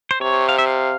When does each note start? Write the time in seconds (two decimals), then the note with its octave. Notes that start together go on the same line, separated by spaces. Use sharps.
0.11 C5
0.21 C3 C#5
0.49 F5
0.58 E5
0.67 F5